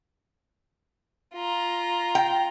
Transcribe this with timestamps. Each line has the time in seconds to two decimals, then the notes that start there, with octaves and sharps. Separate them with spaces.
1.34 F4 A#5
2.15 G5